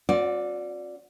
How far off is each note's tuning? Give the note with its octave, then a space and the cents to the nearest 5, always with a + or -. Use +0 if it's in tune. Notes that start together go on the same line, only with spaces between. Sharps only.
C#4 -45 F#4 -40 D5 +0